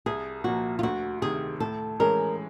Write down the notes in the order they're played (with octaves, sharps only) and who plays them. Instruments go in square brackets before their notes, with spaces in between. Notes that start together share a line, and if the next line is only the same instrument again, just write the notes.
[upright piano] C2 [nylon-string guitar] G#4
[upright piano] A#2 F3 A#3 [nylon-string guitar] F#4
[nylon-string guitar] F4
[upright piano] D2 [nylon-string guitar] F#4
[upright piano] C3 D#3 [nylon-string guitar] G#4
[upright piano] A2 [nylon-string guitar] A4
[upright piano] E3 G#3 C#4 [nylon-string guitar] A#4